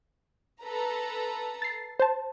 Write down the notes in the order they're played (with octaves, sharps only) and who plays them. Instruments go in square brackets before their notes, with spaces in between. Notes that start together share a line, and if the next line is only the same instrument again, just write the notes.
[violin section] A4 B4 A#5
[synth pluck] A6 C7
C5 A5